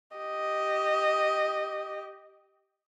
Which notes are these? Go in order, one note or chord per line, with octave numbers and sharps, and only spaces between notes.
G4 D#5